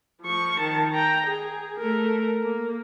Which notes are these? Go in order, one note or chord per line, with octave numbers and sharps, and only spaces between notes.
F3 C#6
D#3 A5
G5 A#5
G#4
A3 A#4
A#3